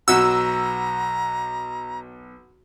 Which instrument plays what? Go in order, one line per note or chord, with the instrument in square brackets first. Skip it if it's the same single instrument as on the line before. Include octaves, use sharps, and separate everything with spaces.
[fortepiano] B1 F#3 F#4 [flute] A#5 [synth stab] E6